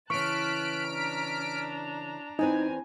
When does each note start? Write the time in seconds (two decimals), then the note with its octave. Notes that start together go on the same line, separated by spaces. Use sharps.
0.10 C#3 E3 A5 C#6 F6 F#6 B6 D7
0.89 D4 A#5
2.39 E2 C4 D#4 B4 G#5